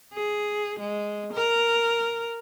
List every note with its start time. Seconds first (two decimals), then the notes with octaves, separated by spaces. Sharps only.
0.13 G#4
0.79 G#3
1.33 A#4